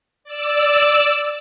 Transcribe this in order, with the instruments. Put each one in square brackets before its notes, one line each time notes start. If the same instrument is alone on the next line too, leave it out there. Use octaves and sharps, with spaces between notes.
[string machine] D5 E6